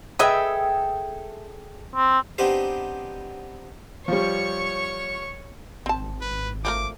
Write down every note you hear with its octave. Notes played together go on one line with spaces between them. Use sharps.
G#4 A4 B4 D#5 E5 G5
C4
B3 C4 D4 D#4 G4 C5
F3 G3 C#5 C#6
G#1 C4 A5
B4
F3 A3 A#4 D6